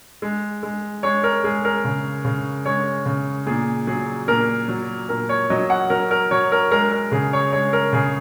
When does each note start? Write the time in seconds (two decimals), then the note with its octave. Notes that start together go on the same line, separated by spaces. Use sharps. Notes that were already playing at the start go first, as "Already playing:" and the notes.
0.22 G#3
0.63 G#3
1.03 G#3 C#5
1.23 A#4
1.44 G#3 G#4
1.65 A#4
1.85 C#3
2.25 C#3
2.65 G#3 C#5
3.06 C#3
3.47 A#2 G#4
3.87 F#3 G#4
4.28 A#2 A#4
4.68 F#3
5.09 A#2 A#4
5.29 C#5
5.50 F#3 D#5
5.70 F#5
5.90 F#3 A#4
6.11 A#4
6.31 F#3 C#5
6.52 A#4
6.71 G#3 A#4
6.92 A#4
7.12 C#3 G#4
7.33 C#5
7.53 G#3 C#5
7.73 A#4
7.93 C#3 G#4